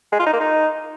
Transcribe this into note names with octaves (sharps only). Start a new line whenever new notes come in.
G#3
F4
D#4
A#3
D#4